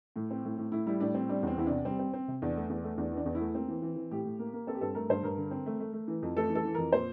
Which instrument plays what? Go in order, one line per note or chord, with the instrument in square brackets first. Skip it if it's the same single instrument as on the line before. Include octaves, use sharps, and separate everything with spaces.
[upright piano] A2
C4
A2
A2
A2 E4
G3 E4
A2 D4
C4
G3 D4
E2 C4
E2 E4
C3 D4
G3 C4
C4
C4
C3
E2 D4
A3
E2
A3
E2 D4
E3
D4
E2
E4
A3
A#3 C4
E3
E3
E3
A2 G4
A2
A#3
A#3
C4 A4
G4
G2 A4
A3 A#4
G2 C5
G2 A#4
D3
C4
A3
A3
A3
E3
F2
A3 A4
E3
A4
E3
F2 A#4
A#2 C5